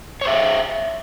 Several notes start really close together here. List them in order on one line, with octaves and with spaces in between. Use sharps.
C#5 C5 E5